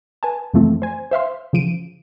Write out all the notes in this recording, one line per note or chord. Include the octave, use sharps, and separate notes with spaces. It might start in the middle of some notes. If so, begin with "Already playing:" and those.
B4 G#5 A5
F#2 C#3 E3 F3 A3 C4
C5 G#5
C5 E5 F5 C6
C#3 F3 D7 D#7